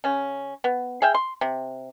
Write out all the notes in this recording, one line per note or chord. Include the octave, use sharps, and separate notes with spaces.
C#3 C#4
B3
G#4 E5 F5 G5
C6
C3